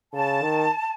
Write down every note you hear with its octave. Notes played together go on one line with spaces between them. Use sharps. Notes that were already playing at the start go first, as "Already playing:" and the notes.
C#3 A5
D#3